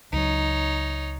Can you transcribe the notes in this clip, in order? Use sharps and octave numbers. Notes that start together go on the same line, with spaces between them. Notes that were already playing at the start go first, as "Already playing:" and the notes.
C#2 F#3 D#4 C#5